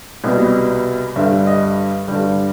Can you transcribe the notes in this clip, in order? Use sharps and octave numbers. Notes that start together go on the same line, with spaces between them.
C2 B2 G3 B3
G2 D3 G3 E5
D#5
G2 D3 G3